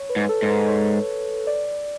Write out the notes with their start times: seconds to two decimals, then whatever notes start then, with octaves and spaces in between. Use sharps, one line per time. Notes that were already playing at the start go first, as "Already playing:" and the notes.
Already playing: C#5
0.09 B4
0.16 G#2
0.29 A4
0.42 G#2
0.49 B4
0.68 C#5
1.47 D5